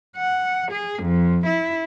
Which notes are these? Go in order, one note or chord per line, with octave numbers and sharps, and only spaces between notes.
F#5
G#4
F2
E4